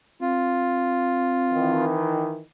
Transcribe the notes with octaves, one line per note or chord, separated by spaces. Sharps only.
C4 F4
D#3 E3